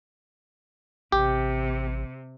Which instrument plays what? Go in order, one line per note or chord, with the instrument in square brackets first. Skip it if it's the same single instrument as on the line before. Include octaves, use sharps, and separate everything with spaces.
[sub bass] A1 [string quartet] C3 [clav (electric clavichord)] G4